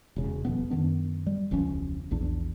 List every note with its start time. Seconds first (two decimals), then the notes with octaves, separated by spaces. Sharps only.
0.16 E1 C#3
0.45 D#1 F2 B2 B3
0.70 F#2 D#3 B3 D4
1.27 G3
1.51 E1 C#2 F3 C#4
2.11 A#1 E2 D4